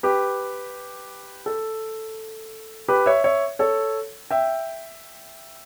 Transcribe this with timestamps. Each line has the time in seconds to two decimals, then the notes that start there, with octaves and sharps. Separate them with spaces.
0.03 G4 B4
1.46 A4
2.88 G4 B4
3.06 C#5 E5
3.24 C#5 E5
3.59 A4 C#5
4.31 E5 G5